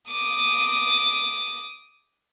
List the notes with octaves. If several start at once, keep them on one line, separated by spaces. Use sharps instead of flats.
D6 D#6